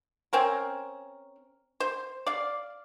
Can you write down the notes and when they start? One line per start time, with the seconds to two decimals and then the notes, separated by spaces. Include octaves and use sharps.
0.33 C4 C#4 A#4
1.80 C5
2.26 D5 F5